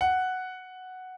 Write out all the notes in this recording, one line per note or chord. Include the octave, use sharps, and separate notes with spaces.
F#5